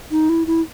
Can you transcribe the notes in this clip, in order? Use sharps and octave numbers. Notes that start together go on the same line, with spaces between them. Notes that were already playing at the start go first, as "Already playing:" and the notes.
D#4
E4
E4